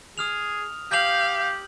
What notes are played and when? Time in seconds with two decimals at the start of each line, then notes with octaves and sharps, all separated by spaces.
0.18 G#4 D#6 F6 F7
0.91 G4 F5 G6 F#7